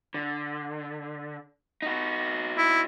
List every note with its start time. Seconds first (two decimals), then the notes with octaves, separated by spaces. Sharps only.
0.14 D3
1.82 D#4 F#4
2.58 E4